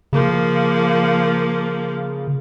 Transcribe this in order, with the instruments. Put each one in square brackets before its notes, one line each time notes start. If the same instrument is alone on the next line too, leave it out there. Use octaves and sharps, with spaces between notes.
[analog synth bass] C#3 [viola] F3 A#3